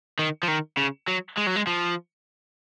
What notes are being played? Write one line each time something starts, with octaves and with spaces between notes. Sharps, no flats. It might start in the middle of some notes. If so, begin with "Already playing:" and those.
D#3
F3
D#3
C#3
F#3
G#3
F#3
G#3
F3